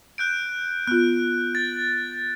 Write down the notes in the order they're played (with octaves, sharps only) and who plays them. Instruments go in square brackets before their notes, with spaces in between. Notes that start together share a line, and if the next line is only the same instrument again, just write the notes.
[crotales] F#6 G6 D7
[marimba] B3 F4 [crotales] F#6
[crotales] A6